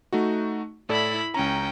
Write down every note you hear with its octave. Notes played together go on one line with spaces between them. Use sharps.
A3 D#4 F#4
A2 E4 A4 D5 B5
C#2 C#4 G5 A#5